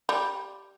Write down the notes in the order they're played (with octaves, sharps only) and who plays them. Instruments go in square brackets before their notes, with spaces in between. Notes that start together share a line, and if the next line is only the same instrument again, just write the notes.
[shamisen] G3